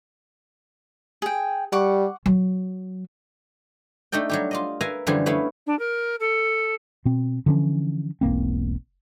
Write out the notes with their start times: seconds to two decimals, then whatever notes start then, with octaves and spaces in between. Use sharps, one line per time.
1.22 G#4 G5
1.72 G3 F#5 C#6 D6
2.26 F#3
4.12 A3 D4 D#4 A4 G5
4.29 F#3 G3 G4
4.51 F4 D5 D#5
4.81 A#4 B4 E5 F5 G#5 A#5
5.07 F#2 D3 E3 F3 G3 G#4
5.26 A3 B3 C#4 E4 F5
5.66 D4
5.79 A#4
6.20 A4
7.05 B2 C4
7.46 D3 E3 F3 C#4
8.21 E1 B1 A#3 C4